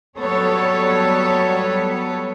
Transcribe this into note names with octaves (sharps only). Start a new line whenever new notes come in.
F#3 G3 B3 A4 C#5